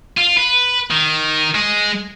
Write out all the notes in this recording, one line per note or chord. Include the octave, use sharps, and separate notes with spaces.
F4
B4
D#3
G#3